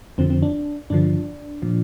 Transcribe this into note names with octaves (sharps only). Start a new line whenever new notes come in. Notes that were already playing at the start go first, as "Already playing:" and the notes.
F2 D3 F3 C4
C4
D4
G2 D3 F3 D4
A#2 F3